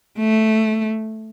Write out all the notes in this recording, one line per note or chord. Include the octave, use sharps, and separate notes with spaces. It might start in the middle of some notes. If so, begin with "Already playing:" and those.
A3